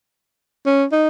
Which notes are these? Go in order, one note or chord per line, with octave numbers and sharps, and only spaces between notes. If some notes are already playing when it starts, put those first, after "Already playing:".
C#4
D#4